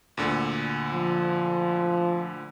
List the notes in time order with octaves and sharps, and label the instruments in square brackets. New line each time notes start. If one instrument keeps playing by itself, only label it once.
[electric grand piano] D2 A#2 D3
[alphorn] F3